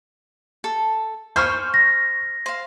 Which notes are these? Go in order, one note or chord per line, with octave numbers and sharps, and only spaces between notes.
A4
C5 G#5 B5 C#6 F6 G6
A#6
C5 F5